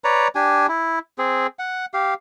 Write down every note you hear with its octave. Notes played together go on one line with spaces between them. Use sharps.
B4 C#5 D5 A#5
D4 G4 G#5
E4
C4 G#4
F#5
G4 F5